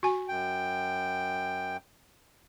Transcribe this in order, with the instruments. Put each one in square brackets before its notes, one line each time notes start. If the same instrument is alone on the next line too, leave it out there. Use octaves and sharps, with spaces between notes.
[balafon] F#4 G#5
[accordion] F#2 G5